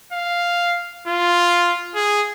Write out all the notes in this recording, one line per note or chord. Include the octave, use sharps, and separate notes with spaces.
F5
F4
G#4